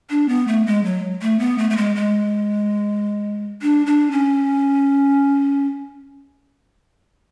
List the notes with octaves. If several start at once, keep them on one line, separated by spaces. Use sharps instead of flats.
D4
B3
A3
G#3
F#3
A3
B3
A3
A3
G#3
G#3
D4
D4
C#4